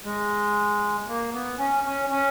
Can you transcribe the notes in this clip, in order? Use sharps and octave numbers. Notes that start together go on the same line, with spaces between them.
G#3
A#3
B3
C#4
C#4
C#4